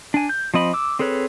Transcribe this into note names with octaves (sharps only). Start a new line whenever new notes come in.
D4 G#5
G6
F3 C4 D#5 B5
D6 E6
C4 G#4 A4 B4 C#5